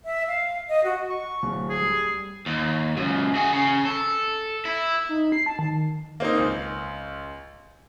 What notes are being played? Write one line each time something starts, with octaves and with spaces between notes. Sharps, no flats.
E5
F5
D#5
F#4
C#6
D1
G#4
G3
D#2
C#2 F#2
F#4 G#4
C#3
A4
E4
D#4
C7
A5
D#3
A#3 C4 D#4
C#2